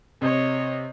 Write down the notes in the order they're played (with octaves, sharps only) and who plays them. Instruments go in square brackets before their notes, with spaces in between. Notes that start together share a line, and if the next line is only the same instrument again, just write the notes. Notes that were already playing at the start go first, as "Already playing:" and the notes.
[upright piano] C3 [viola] C#5 D#5